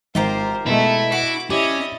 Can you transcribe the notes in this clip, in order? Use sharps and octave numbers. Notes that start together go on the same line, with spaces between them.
G#1 F4 G4 A#4 C5
B2 G#3 A3 E4
F#4 D6
C#4 E4 G4 D5 D#5